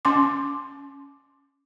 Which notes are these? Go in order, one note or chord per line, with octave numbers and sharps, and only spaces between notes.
C#4 C6 D6